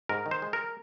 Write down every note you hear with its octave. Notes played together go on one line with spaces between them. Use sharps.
G#2 A#4
D#3
C5
G#3
A#4